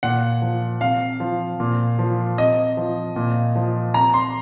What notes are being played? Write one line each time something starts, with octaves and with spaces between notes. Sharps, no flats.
A#2 F#5
F3
C3 F5
F3
A#2
F3
C3 D#5
F3
A#2
F3
C3 A#5
C6